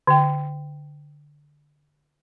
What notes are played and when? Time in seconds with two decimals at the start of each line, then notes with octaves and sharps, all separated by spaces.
0.07 D3 G5